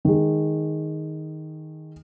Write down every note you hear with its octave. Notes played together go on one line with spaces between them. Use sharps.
D#3 G#3